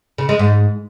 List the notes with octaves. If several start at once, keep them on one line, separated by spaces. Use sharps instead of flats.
C#3
G#3
G#2